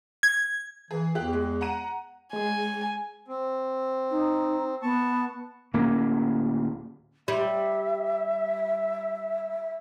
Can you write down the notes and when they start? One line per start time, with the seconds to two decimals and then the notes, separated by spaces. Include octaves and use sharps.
0.23 G#6
0.91 E3 G#4
1.15 E2 G4 F#6
1.33 G#3
1.61 F#5 A#5 D#7
2.33 G#3 G#4 G#5
3.28 C4
4.10 D#4
4.82 B3 A5 C#6
5.73 D1 A#3 C#4
7.28 G3 E5